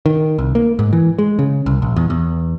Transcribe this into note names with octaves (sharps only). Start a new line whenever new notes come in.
D#3
C2
A#3
G#2
E3
G#3
C#3
C2
A#1
E2
E2